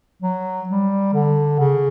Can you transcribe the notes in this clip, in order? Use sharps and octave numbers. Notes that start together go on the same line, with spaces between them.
F#3
G3
D3
C#3